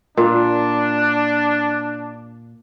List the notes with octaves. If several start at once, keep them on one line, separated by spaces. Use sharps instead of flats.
A#2 D4